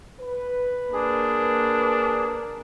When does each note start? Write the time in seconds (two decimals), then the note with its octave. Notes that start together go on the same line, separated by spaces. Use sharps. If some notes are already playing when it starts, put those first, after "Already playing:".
0.20 B4
0.93 A#3 D4 G#4